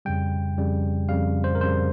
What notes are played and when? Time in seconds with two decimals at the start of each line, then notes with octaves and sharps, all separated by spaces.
0.05 F2 C#3 G3 G5
0.58 F2 C#3 G3
1.09 F2 C#3 G3 F5
1.44 C5
1.55 A#4
1.61 F2 C#3 G3 C5